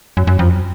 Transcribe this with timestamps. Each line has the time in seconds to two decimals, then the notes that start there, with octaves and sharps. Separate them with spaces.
0.17 F#2
0.27 F#2
0.39 F2